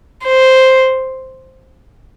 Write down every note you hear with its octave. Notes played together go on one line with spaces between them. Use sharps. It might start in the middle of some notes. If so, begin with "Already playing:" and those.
C5